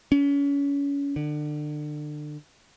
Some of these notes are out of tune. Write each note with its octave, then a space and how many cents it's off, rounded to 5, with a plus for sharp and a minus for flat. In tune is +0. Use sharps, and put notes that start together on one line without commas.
C#4 +30
D3 +30